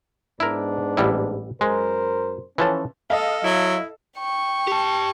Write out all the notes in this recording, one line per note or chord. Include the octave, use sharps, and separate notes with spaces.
G#2 B3 D4 E4 A#4
A1 G3 E4
F#2 G#3 A#4 C5
E3 F3 C#4 A4
A4 D#5 F5
F#3 E4
G5 C#6
G4 A5